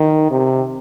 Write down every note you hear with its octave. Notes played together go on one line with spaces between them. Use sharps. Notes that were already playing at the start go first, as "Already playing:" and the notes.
Already playing: D#3
C3